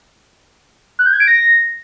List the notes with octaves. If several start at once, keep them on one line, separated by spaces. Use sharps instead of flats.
F#6
G6
G#6
D7
A#6